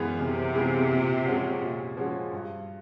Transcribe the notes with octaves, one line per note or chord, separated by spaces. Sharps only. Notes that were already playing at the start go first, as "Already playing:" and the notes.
Already playing: F#2 C#3 E3 G#3 B3
F#2 C3
C#3 E3 G#3 B3
A#2
F3 G#3 C#4 F#4
A#2
F3 G#3 C#4 F#4
G2